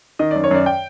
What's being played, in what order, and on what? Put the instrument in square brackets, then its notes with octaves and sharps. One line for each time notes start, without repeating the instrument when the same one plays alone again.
[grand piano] D#3 D#5
F#2 D5
C#5
F#2 D5
G5